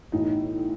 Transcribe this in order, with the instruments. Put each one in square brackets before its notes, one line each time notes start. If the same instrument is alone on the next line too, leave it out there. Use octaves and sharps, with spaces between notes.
[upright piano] B1 A2 E3 D#4